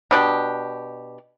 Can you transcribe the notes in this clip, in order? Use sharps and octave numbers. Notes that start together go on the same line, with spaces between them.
B2 D4 G4